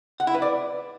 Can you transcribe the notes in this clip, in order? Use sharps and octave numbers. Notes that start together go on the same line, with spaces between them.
F#5
E4
B4
D5